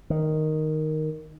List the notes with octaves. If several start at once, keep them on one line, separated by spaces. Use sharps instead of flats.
D#3